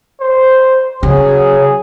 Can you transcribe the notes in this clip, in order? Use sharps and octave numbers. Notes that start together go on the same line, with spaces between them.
C5
C#3 F#3 G#4